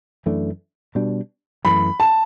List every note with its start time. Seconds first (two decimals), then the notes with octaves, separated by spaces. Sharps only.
0.26 F#2 E3 A3 D4
0.95 B2 G3 D4
1.65 F#2 E3 A3 B5
2.00 A5